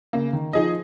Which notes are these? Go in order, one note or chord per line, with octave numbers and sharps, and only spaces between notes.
C#3 A#3
D#3
F3 D#4 G#4 D#5